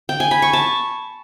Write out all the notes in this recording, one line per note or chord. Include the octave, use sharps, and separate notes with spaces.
G5
G#5
B5
C#6
A5